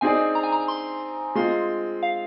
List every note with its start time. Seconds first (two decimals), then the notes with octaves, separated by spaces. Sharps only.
0.01 C4 D#4 G#4 D5 G#5
0.35 A#5
0.43 G#5
0.52 A#5
0.68 C6
1.35 G#3 C4 F4 C6
2.03 F5